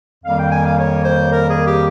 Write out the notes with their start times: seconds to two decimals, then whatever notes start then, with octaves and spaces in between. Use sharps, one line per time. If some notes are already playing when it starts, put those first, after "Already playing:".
0.24 F2 D#3 G3 A#3 F5
0.38 G5
0.50 G#5
0.64 F5
0.77 C#5
1.03 C5
1.30 A#4
1.47 G#4
1.65 G4